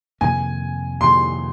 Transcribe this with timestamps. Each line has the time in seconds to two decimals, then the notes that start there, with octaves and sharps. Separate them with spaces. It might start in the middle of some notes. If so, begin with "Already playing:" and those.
0.21 F2 C3 D#3 A#3 G#5
1.00 F2 C3 D#3 A#3 C6